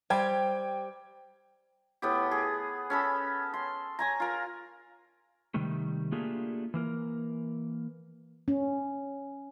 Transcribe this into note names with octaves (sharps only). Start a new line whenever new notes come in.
G3 C5 G5 G#6
A2 B3 G4
G#4
C#4 A4 B5
C6
C#5 G#5 A#5
F4 A#4
C3 D#3 G3 A3
A3 A#3 D4 F4 G4 G#4
E3 A#3 A#4
C#4